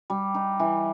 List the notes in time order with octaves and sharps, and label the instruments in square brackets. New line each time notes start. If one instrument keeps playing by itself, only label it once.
[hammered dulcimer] G3
D#4
E3